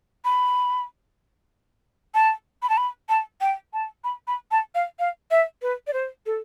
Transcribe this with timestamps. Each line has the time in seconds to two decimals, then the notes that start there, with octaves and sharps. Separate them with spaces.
0.25 B5
2.15 A5
2.63 B5
2.70 A5
2.77 B5
3.09 A5
3.41 G5
3.73 A5
4.04 B5
4.28 B5
4.51 A5
4.75 F5
4.99 F5
5.31 E5
5.62 B4
5.87 D5
5.93 C5
6.26 A4